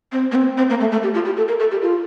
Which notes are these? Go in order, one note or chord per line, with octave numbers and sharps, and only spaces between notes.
C4
A#3
C4
C4
A#3
A3
A3
G4
F4
G4
A4
A#4
A4
G4
F4